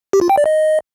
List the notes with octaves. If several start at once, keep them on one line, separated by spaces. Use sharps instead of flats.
G4
F4
G5
D5
D#5